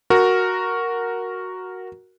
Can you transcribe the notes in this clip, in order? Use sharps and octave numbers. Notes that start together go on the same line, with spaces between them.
F#4 A#4